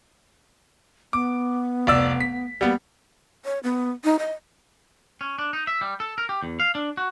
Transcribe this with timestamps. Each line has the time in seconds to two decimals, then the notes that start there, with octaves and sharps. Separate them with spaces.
1.13 B3 D6
1.87 F1 D5 E6
2.20 B6
2.61 G3 A#3 B3
3.45 C#5
3.63 B3
4.04 D#4
4.19 D#5
5.21 C#4
5.39 D4
5.53 D#4
5.67 E5
5.81 G3
6.00 A4
6.18 A#4
6.29 G4
6.43 E2
6.60 F5
6.75 D4
6.97 F#4